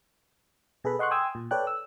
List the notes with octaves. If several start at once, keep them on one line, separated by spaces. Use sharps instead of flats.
B2 G#4 A4 B4 B5
D#5 F#5 C6 C#6 F#6
G5 G#5 C6 D#6 E6 G#6
A#2
A4 B4 C#5 D5 G5 F#6
E6